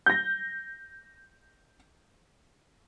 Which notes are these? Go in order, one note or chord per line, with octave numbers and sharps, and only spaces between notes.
G6 A#6